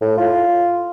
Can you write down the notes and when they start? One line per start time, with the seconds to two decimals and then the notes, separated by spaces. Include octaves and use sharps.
0.01 A2
0.18 F4